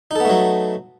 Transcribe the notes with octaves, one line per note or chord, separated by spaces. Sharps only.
F#3 A3 B3 D#4 A4